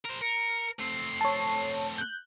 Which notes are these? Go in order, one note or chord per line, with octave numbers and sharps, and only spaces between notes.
A#4 C5
A#4 C#7
A3 C4 C7
C#5 A5
F#6 G6